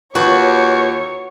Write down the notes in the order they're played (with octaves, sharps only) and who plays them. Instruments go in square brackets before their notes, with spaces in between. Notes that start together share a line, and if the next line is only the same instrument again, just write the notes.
[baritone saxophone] D#2 [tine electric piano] F4 B4 [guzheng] F#4 [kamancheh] C#5 C#6